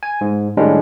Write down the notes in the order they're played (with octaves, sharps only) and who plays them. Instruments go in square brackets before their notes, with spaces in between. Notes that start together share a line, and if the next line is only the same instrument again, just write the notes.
[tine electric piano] G#5
G#2
A2 D#3 G3 G#3 C#4 D4